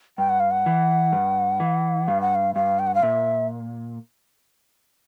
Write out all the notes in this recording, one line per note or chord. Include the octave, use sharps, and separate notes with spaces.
G2 G5
F#5
F5
F#5
E3
G2
E3
G2 F5
F#5
F5
G2 F5
G5
F#5
F5
A#2 E5